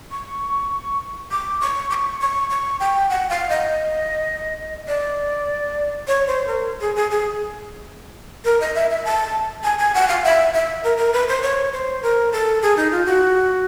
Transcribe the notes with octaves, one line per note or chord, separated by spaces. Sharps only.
C#6
D6
C#6
D6
C#6
C#6
C#6
G5
F#5
F5
D#5
D5
C#5
C5
A#4
G#4
G#4
G#4
A#4
D#5
E5
E5
A5
G#5
G#5
F#5
F5
E5
E5
A#4
A#4
B4
C5
C#5
C5
A#4
A4
G#4
D#4
F4
F#4